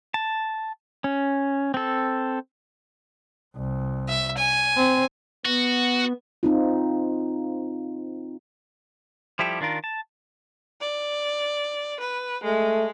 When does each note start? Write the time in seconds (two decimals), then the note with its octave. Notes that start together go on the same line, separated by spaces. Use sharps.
0.14 A5
1.04 C#4
1.74 C4 A4
3.56 C2
4.08 E5
4.37 G#5
4.77 C4
5.45 B3 F#4
6.43 C4 D#4 F4
9.39 F3 G3 E4 G4 A4
9.60 D#3 D4 F4 A#4
9.84 A5
10.81 D5
12.00 B4
12.44 G#3 A3